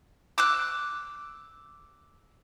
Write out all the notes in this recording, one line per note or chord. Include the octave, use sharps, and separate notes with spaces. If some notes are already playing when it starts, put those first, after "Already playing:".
D6 E6 F#6